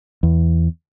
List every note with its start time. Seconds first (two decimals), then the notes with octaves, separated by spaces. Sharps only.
0.23 E2